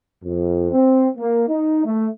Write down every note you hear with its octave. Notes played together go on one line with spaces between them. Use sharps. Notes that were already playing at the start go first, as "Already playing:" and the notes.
F2
C4
A#3
D#4
A3